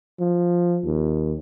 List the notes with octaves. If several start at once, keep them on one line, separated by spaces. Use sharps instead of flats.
F3
D#2